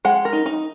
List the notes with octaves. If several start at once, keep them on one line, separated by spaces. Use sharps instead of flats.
G#3 F#5
A#4
D#4
D#4